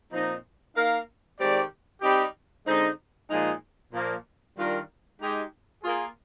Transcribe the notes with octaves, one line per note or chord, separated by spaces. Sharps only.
A#2 F3 C4 D#4
A#3 D#4 A#4 F5
D#3 G#3 C4 G4 D5
G3 C4 D#4 G4
D3 G#3 C4 D#4
A#2 F3 G#3 D#4 G#4
A#2 F3 A#3
D#3 G3 D4 F4 A#4
G#3 D#4 G4
A#3 F4 G#4